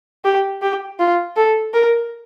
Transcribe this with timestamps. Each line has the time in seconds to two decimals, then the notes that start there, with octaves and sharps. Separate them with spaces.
0.25 G4
0.62 G4
0.99 F4
1.36 A4
1.74 A#4